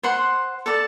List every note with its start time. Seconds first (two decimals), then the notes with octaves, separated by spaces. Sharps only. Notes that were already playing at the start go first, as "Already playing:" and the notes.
0.03 C5 F#5 C6
0.66 A4 D5 A5